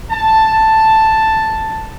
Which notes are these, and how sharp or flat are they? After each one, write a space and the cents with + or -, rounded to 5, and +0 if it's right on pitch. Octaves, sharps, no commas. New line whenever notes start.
A5 +5